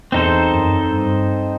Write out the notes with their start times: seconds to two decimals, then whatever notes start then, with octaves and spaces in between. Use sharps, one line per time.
0.12 E2 C4 D#4 A4 C5
0.51 F#2
0.91 G2